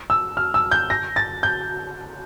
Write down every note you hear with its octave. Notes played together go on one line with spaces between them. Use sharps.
E6
F6
E6
G6
A#6
A6
G6